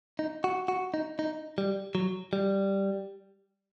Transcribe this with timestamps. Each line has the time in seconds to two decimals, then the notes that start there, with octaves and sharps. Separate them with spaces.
0.19 D#4
0.44 F#4
0.68 F#4
0.94 D#4
1.19 D#4
1.58 G3
1.95 F#3
2.33 G3